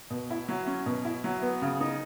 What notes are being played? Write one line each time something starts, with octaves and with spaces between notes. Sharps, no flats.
B2
E4
F#3
C#4
B2
E4
F#3
B3
C#3
D#4